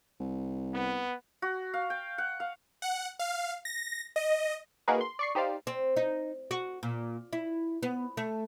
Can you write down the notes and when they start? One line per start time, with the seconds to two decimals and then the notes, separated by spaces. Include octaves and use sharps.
0.20 C2
0.74 B3
1.42 F#4
1.74 F5
1.90 G5
2.18 F#5
2.40 F5
2.82 F#5
3.19 F5
3.65 A#6
4.16 D#5
4.88 A#3 D#4 F#4 G#4 A#4 B4
5.01 C6
5.19 D5 C#6 C7
5.35 D#4 G4 C5 D5 F5
5.67 C4
5.96 D#4
6.51 F#4
6.83 A#2
7.33 E4
7.83 B3
8.17 A3